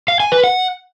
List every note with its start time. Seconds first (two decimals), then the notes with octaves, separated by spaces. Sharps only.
0.08 F5
0.20 G#5
0.32 B4
0.44 F#5